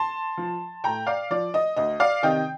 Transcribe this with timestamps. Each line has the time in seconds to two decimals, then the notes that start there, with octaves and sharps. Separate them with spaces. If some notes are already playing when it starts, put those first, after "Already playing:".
Already playing: A5 C6
0.37 F3
0.84 A2 G5 A#5
1.07 D5 F5
1.30 F3 D5
1.54 D#5
1.76 D2 D#5
2.00 D5 F5
2.23 C3 D#3 D#5 G5